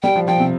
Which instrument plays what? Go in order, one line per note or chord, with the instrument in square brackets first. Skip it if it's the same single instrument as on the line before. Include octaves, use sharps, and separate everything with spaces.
[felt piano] G3 [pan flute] G5
[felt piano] F3
[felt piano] F3 [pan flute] G5
[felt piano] C3